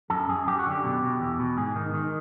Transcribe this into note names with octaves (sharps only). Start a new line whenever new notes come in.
F#2 A4
F#2 G#4
F#2 G4
F#4
D3
G4
B2
B2
E2
B2
G#2 G#4
D#3
D#3